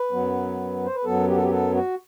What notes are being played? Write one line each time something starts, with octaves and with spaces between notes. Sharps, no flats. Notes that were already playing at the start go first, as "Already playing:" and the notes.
Already playing: B4
F#2 F#3 B3
C5
B4
F#2 F#3 B3 A4
G4
A4
G4
A4
F#4